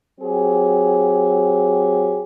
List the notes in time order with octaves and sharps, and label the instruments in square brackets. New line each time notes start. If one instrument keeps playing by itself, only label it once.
[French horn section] F#3 C4 G4 G#4